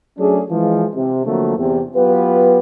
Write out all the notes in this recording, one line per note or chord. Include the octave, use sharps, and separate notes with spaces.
F#3 A3 C#4 D4 G#4
E3 F3 G#3
C3
D3 F3 F#3 A3 A#3
E2 C3
F#3 B3 F4 G4 B4